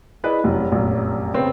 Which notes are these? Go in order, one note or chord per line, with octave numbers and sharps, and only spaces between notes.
E4 G#4 B4 D5 D#5
F1 F#2
F1 A#1 F#2
C#3 B3 C4 C#5 G5